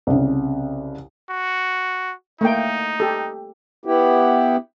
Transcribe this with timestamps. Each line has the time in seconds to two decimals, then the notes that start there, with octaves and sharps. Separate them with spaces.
0.07 C2 C#3
1.30 F#4
2.41 A3 A#3 D#4 G5
3.00 G4 A4
3.85 B3 E4 G4